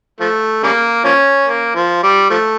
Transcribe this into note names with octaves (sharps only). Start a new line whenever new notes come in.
F3 A3
C#3 G3 A#3
F3 A#3 C#4
A#3
F3
G3
F3 A3